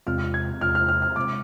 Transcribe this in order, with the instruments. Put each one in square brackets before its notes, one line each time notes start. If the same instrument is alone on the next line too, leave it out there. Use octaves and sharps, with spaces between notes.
[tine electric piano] E2 C3 G#3 C4 F4 [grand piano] F6
[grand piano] G#6
[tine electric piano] E2 C3 G#3 C4 F4 [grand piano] F6
[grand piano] F6
F6
F6
[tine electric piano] C3 G#3 C4 [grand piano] D6